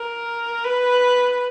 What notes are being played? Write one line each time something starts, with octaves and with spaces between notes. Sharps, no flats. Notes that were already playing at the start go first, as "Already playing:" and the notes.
Already playing: A#4
B4